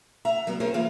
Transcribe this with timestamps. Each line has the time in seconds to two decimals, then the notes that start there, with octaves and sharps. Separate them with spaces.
0.25 E5 F#5 A#5
0.47 F#3 G3 B3
0.60 C#4 G#4 A#4 C5 C#5
0.74 E3 A#3 F4